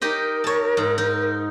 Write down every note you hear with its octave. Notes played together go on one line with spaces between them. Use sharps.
D#4 G4 A#4 D#5
C#5 A5
G#2
D#4